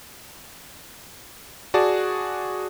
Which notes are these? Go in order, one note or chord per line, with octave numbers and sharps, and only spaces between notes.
F#4 G#4 D5 A5